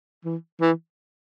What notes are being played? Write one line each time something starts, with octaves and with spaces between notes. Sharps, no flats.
E3
E3